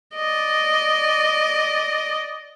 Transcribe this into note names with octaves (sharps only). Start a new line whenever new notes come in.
D5 D#5